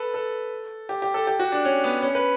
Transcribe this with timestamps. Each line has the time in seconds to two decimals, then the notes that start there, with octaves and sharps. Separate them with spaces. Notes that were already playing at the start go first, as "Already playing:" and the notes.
Already playing: A4 B4
0.14 A4
0.89 G4
1.02 G4
1.14 A4
1.27 G4
1.40 F#4
1.52 D4
1.65 C#4
1.84 B3
2.02 C#4
2.15 B4